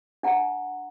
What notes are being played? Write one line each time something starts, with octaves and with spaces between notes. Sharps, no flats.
D4 F#5 A#5